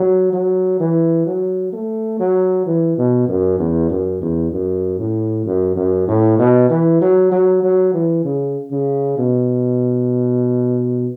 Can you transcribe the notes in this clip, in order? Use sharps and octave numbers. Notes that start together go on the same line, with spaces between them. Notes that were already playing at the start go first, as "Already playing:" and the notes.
Already playing: F#3
F#3
E3
F#3
A3
F#3
E3
B2
F#2
E2
F#2
E2
F#2
A2
F#2
F#2
A2
B2
E3
F#3
F#3
F#3
E3
C#3
C#3
B2